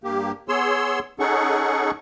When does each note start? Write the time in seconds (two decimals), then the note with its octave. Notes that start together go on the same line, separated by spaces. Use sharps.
0.04 G2 A#3 G4
0.48 B3 G#4 C#5 C6 E6
1.19 C#4 D#4 G#4 A4 F#5 C#6